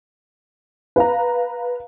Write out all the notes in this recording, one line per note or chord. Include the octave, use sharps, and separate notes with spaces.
B4 F5 A#5